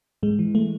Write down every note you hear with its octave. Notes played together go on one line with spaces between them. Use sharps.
G#2 G#3
E3
A3